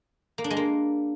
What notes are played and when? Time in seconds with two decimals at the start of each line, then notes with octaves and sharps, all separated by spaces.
0.38 A#3
0.44 D4
0.50 G#3
0.57 A#3